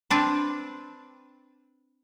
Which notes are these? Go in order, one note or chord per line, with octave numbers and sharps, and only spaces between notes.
C4 D4 B4